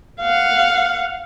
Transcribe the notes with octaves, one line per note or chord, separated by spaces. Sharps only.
F5 F#5